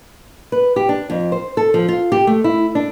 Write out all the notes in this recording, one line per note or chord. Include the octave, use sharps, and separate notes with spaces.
B4
G4
D4
F2
C5
A4
F3
F4
G4
A3
E4
D4